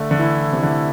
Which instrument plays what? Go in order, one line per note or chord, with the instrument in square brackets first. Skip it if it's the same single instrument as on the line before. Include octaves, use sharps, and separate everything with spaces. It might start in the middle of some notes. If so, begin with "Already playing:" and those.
Already playing: [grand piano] D3 [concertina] A3
[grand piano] D3
[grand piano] E3 [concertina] E4
[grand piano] C3
[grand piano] D3 [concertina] A3